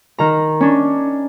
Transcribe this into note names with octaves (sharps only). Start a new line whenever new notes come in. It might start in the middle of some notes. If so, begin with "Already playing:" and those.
D#3 A#5
C#4 D4